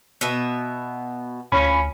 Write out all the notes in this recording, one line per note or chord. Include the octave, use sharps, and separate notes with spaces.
B2 B3 E5
D2 F3 C#4 B5